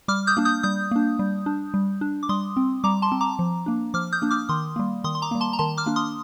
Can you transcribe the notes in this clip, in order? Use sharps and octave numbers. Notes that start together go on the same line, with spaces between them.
G3 D6 F6
D#6 G6
A#3 D4
D#6 G6
G3 D#6 G6
A#3 D4
G3
D4
G3
D4
D6
G3 C6 D#6
C4
G3 A#5 D6
A5 C6
C4
A#5 D6
F3
A#3 D4
F3 D6 F6
D#6 G6
A#3 D4
D6 F6
D#3 C6 D#6
G3 A#3
D#3 C6 D#6
C6
A#5 D6
G3 A#3
A5 C6
A#5
D#3 A5 C6
D6 F6
A#3 D4
C6 D#6